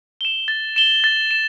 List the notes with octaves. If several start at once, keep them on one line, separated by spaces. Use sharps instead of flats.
E7 G7
A6
E7 G7
A6
E7